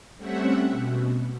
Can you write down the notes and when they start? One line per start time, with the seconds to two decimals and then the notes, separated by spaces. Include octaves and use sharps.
0.17 G3 A3 C4 C#4 E5 F#5
0.70 B2